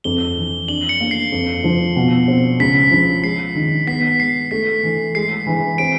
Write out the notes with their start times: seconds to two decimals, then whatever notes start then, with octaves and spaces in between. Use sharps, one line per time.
0.04 F2 G7
0.37 E3
0.68 D4 F#7
0.89 C#7
1.01 A#3
1.11 C7
1.32 F2
1.64 F3
1.96 B2
2.28 C4
2.60 C#2 B6
2.91 F3
3.24 G#3 C7
3.55 D#3
3.87 B3 B6
4.20 G#3 C7
4.51 A3 B6
4.83 E3
5.15 G#3 C7
5.47 E3
5.78 C4 D7